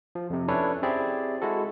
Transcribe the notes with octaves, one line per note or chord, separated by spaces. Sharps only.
F3
F2 C3
C#4 D4 E4 A4 B4 C#5
C4 E4 G4 G#4 D5
G#3 E4 F#4 A4